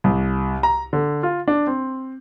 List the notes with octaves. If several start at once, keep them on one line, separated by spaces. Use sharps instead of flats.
C2
A#5
D3
F4
D4
C4